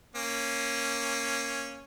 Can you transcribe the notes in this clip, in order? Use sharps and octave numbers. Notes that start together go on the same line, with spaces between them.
A#3 C#4